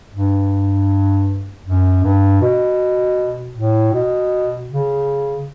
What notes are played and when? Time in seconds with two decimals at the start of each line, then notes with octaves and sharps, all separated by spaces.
0.13 G2
1.65 F#2
2.03 G2
2.41 B2
3.55 A2
3.93 B2
4.69 C#3